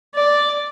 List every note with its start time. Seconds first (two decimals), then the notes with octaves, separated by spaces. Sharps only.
0.15 D5